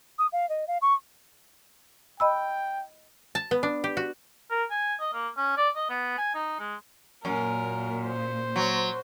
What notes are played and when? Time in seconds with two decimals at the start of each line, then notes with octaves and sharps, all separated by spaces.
0.19 D#6
0.32 F5
0.49 D#5
0.68 F5
0.82 C#6
2.20 D#5 G5 B5 E6
3.35 A5
3.51 B3
3.63 D4
3.84 G4
3.97 F#4
4.51 A#4
4.71 G#5
5.00 D#5
5.13 A#3
5.37 C#4
5.57 D5
5.76 D#5
5.90 B3
6.18 G#5
6.35 D#4
6.60 G#3
7.25 F#2 A#2 A#4
8.06 C5
8.56 F#3